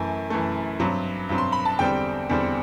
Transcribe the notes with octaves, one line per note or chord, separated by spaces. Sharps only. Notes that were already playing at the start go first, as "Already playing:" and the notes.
Already playing: F#2 E3 A3
F#2 E3 A3
G2 F#3 C4
G2 F#3 C4
C6
B5
A5
E2 D3 G3 C4 G5
E2 D3 G3 C4